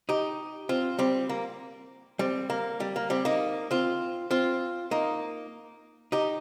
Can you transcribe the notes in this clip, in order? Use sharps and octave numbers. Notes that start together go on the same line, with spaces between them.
D#4 G4
C4 F4
G3 C4
A#3
G3 C4
A#3
G3
A#3
G3 C4
A#3 D#4
C4 F4
C4 F4
A#3 D#4
D#4 G4